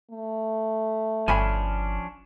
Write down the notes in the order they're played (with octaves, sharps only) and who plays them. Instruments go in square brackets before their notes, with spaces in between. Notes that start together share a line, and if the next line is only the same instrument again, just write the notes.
[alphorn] A3
[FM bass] G1 [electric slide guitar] F3 C#4 D4 [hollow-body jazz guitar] G#5 B5